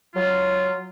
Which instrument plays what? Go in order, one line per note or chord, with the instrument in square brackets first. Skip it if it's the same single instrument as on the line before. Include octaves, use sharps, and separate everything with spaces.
[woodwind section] F#3 F4